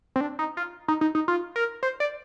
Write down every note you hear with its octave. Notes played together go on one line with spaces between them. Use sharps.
C4
D4
D#4
F4
D#4
D#4
D#4
F4
A#4
C5
D5